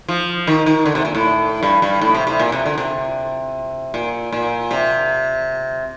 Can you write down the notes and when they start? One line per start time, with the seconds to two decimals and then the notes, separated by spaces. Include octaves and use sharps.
0.09 F3
0.47 D#3
0.66 D#3
0.86 D3
0.95 C3
1.05 A#2
1.15 A2
1.63 G2
1.82 G2
2.01 A2
2.15 C3
2.27 C3
2.39 A#2
2.52 C3
2.66 D3
2.78 C3
3.94 A#2
4.33 A#2
4.71 C3